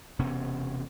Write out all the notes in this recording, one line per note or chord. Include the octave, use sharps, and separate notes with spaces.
E1 C3 B3 C#4